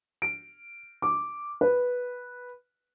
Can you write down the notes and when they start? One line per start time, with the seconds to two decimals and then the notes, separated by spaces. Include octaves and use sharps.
0.22 D7
1.02 D6
1.61 B4